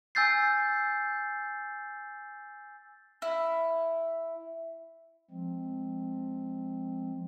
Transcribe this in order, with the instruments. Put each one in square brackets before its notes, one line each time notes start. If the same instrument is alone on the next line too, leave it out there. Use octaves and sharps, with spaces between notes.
[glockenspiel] G#5 E6 G6 A6 C7
[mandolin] E4
[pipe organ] F3 G#3 C4